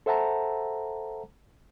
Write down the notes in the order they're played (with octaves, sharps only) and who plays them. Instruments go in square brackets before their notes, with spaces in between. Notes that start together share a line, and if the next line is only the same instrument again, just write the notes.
[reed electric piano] A4 C5 E5 F#5 A5 A#5